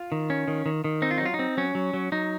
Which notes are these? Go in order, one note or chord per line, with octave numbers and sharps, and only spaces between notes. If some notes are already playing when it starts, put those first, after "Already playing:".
Already playing: F4
D#3
C#4
D#3
D#3
D#3
C4 D#4
F4
F#3 D#4
F4
D#4
C4
F#3 C#4
F#3
F#3
F#3 D#4